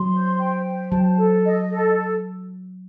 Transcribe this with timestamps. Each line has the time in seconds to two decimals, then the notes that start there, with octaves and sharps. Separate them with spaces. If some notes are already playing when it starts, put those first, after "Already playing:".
Already playing: F#3 C6
0.13 C5
0.39 G5
0.65 C5
0.92 F#3 A5
1.18 A4
1.45 D#5
1.71 A4